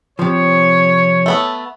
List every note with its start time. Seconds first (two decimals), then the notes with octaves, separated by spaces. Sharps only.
0.19 C3 F3 C#5
1.26 A3 B3 A4